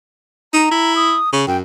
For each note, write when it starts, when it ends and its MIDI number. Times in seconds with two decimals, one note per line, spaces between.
0.54 0.69 63
0.54 0.94 82
0.71 1.17 64
0.96 1.30 87
1.33 1.45 49
1.47 1.61 42
1.47 1.57 79